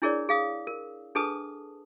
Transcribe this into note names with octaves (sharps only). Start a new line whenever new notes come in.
D4 E4 G#4 A#4 C#5 D5
G#4 F5 D#6
A#4
D4 G#4 A4 B4 A5 D#6